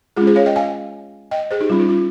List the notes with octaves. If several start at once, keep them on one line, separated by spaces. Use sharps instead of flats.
G#3 C#4 F4 G#4
G#4 C5
C#5 F5
D#5 G5
F5 G#5
D#5 G5
G#4 C5
D#4 G4
G3 C#4 F4
D#4
F4